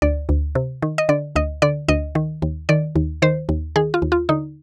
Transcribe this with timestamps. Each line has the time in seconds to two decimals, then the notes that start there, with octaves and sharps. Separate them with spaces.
0.02 D2 D5
0.29 D2
0.55 C3
0.82 D#3
0.98 D#5
1.09 D3 D5
1.36 D2 D#5
1.62 D3 D5
1.88 D2 D#5
2.15 D#3
2.42 D#2
2.69 D#3 D5
2.96 D#2
3.22 D#3 C5
3.49 D#2
3.76 D#3 G#4
3.94 F4
4.02 D#2
4.12 F4
4.29 D3 D#4